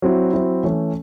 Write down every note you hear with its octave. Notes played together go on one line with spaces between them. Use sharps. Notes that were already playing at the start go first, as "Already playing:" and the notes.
F#3 C4 E4
F#3 C4 E4
E3 A3 C#4